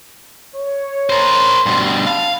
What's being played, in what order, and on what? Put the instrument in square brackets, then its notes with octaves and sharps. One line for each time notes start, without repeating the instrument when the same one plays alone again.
[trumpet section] C#5
[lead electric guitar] A#4 C5
[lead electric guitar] G2 B2 [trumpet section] C6
[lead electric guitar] F5 [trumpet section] A5 B5